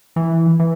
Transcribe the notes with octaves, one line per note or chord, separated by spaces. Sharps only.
E3
E3